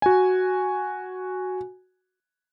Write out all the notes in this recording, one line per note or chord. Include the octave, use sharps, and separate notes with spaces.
F#4 G#5